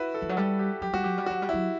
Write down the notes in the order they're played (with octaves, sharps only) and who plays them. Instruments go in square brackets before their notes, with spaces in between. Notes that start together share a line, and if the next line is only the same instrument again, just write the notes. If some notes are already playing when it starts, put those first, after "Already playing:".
Already playing: [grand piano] E4 F#4 B4
A4
[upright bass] E3
F#3
[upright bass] G3 [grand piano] A4
[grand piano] G4
[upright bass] F#3 [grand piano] G4
[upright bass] G3 [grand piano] F#4
[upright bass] F#3 [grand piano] G4
[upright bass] G3
[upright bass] F#3 [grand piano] F#4
[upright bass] G3
[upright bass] F#3 [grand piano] E4